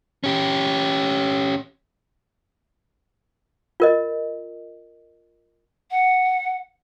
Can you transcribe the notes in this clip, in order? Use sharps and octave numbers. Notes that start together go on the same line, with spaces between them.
C#4 G4
F4 A#4 D#5
F#5